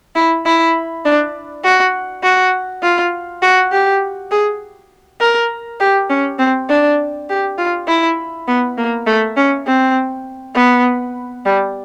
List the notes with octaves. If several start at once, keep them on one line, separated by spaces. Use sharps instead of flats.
E4
E4
D4
F#4
F#4
F4
F#4
G4
G#4
A#4
G4
C#4
C4
D4
G4
F4
E4
B3
A#3
A3
C#4
C4
B3
G3